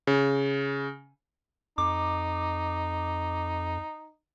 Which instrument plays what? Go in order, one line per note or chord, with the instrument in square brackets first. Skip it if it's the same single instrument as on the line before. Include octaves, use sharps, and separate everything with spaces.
[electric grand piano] C#3
[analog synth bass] F2 [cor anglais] D#4 [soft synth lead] D6